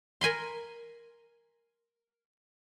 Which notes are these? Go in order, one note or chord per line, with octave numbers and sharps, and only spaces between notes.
A#4 G#5 B5 C6